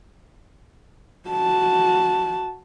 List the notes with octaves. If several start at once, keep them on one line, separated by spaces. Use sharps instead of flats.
F#4 A5